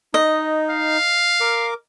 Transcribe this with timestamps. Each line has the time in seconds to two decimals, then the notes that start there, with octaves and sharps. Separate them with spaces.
0.14 D#4 D#5
0.70 F5
1.41 A#4 D6